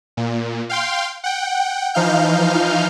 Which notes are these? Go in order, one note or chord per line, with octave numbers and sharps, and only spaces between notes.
A#2
F5 G5 C6
F#5 G5
E3 F3 D#4 F5 F6 G6